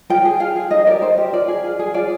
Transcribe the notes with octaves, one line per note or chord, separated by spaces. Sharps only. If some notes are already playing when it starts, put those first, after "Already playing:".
F4 G5
G#4
F4 F5
G#4
D#4 D#5
G4 A#4 D5
D#4 C5
G4 A#4
F4 D5
G#4
F4
G#4
F4 D5